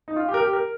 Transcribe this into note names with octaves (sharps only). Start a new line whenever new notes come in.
D#4
F4
G4
A#4
G4
A#4